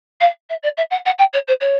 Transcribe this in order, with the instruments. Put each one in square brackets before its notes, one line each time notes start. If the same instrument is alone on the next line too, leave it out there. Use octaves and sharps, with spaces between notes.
[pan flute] F5
E5
D5
E5
F#5
F#5
G5
C#5
C5
C#5